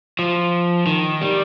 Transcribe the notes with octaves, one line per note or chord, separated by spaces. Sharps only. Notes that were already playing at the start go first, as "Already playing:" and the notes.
F3
D#3
G3